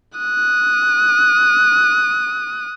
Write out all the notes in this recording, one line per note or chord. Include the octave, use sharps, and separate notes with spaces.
D#6 F#6